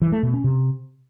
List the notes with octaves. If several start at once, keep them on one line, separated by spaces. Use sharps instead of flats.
E3
A3
B2
C#4
C3